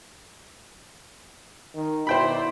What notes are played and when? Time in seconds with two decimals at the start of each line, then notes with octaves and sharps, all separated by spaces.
1.75 D#3
2.07 B2 E4 C5 D5 G5 B5